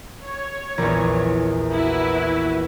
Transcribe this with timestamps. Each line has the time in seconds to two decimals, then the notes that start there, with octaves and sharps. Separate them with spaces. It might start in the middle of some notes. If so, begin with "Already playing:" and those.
0.23 C#5
0.78 A#1 E2
1.72 E4 F#4 B4